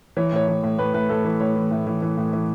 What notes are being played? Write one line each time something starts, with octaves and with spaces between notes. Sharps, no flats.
E3 C#5
A2 C#5
E3
A2
A2 B4
A2 B4
A2 A4
E3 B4
A2 C#5
E3
A2
E3
E3
A2
E3